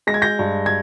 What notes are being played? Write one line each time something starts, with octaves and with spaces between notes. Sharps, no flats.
G#3 A#6
G#6
G6 A#6
G2
G#6